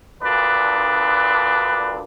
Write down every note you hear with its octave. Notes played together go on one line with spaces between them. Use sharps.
D2 A#2 D4 B4